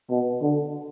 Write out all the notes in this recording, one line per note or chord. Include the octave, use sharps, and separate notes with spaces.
B2
D3